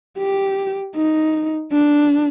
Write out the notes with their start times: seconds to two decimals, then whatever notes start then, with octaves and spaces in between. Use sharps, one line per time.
0.19 G4
0.96 D#4
1.72 D4